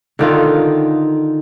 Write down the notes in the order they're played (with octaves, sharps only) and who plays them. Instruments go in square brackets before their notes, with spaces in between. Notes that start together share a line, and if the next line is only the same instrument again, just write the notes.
[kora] D3 D#3 F4